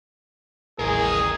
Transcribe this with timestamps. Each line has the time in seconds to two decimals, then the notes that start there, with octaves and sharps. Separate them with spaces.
0.79 A1 D#2 E4 G#4 A#4